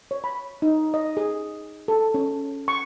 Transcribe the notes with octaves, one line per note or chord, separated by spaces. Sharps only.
C#5
B5
D#4
D#5
G#4
A4
C#4
C#6